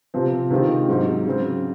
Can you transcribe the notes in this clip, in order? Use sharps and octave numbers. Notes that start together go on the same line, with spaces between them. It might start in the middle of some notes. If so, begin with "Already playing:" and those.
C3 F3 C4
C3 D#3 G#3 C4 F4
G#2 F#3 C4
C#3 F#3 C4